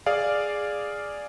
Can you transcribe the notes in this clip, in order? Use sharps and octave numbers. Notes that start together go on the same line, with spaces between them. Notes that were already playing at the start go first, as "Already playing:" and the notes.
G#4 D5 F5